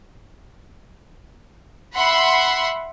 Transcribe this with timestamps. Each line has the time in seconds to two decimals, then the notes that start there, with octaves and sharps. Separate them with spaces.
1.95 E5 F#5 B5 C6